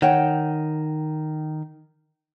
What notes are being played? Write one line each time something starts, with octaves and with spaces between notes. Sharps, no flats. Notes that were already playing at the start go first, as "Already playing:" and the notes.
D#3 C#5 F#5 G5